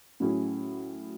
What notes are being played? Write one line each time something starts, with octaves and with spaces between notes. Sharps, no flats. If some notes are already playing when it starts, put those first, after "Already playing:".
A2 F#3 C#4 E4 G#4